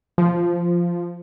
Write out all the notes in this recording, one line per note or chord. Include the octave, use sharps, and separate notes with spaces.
F3